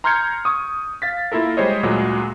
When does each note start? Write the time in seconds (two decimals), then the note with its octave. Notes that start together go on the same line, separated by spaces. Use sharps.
0.04 A#5 C6 F6 G6 G#6 C#7
0.45 C#6 D#6
1.02 F5 A6 B6
1.32 A#3 E4 F4 A4 A#4
1.57 G3 G#3 C5 C#5 D#5
1.83 D2 A#2 F#3 G#3